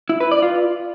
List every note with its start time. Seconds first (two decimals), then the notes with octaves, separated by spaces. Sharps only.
0.09 E4
0.20 B4
0.31 D5
0.42 F4